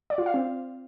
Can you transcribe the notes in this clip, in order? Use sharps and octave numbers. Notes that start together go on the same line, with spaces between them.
D5
F4
F5
C4